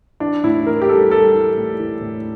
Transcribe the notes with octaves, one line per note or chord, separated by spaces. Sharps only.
E3 D4
A2 E4
E3 A#4
G4
G3 A4
G3 A4
E3
A2
E3
A2